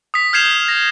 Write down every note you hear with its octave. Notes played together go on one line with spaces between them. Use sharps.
D#6 B6
F6 G6 G#6 C7 E7 F7
A#6